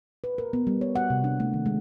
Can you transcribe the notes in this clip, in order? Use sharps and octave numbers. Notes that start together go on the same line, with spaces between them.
B4
A#4
B3
G3
C#5
F#5
C3
D4
A3
D#3
G#3